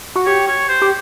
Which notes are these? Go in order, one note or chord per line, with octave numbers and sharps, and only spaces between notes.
F#4
G4 C#5
C#5
C5
G4